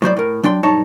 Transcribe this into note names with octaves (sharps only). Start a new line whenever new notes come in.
A2 F#3 C5 D5
A2 A#4
F#3 D4 G5 C6
B1 G2 D#4 C#5 A5